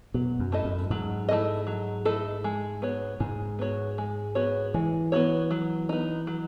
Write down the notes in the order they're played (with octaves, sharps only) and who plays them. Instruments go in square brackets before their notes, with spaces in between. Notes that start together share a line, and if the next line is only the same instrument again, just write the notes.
[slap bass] B2 [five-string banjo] F#3
[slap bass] F#2
[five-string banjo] A3 E4 A4 D#5
[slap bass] F#2
[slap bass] G#2 [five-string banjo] F#3
[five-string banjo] A3 E4 A4 D#5
F#3
A3 E4 A4 D#5
G#3
B3 F#4 C#5
[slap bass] G#2 [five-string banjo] G#3
[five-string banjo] B3 F#4 C#5
G#3
B3 F#4 C#5
[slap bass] E3 [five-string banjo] G#3
[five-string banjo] B3 F#4 C#5
F#3
B3 D#4
F#3